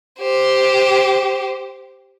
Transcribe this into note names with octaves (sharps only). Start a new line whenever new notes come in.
G4 C5